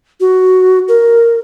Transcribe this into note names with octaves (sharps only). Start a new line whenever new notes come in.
F#4
A#4